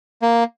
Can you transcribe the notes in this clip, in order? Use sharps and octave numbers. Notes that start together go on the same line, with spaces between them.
A#3